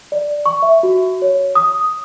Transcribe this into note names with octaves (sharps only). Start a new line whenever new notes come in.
D5
C#6
E5
F#4
C#5
D#6